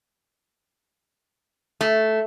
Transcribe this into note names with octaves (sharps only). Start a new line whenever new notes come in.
A3